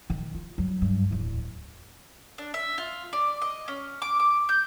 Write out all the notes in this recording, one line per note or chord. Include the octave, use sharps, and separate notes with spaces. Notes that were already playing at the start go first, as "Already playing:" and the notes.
D#3
F4
F#3 G3
G2
D1 E2
D4
E5
F4
D5
D#5
C#4
D6
D6
G6